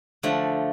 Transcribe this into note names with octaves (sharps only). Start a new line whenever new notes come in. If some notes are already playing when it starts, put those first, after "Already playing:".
D3 F3 A3